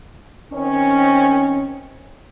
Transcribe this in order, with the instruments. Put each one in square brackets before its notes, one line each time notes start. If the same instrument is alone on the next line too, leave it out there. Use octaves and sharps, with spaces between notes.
[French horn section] D#3 C4 C#4